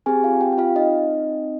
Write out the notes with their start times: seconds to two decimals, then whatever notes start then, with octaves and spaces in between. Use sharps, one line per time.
0.06 C4 G4 G#4 G#5
0.24 F4 F5
0.41 G4 G5
0.53 G5
0.58 F4 F5
0.76 D#4 D#5